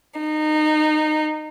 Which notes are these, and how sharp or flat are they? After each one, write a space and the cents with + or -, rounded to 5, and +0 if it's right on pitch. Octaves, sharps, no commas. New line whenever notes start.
D#4 -20